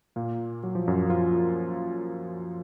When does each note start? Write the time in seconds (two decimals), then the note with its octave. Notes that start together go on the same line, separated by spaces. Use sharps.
0.16 A#2 A#3
0.63 F#3
0.75 F3
0.87 F#2 F#3
1.09 F3 F4